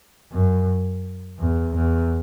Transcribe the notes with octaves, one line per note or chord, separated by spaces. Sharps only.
F#2
E2
E2